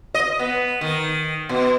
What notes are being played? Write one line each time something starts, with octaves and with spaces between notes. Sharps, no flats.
D#5
B3
D#3
B2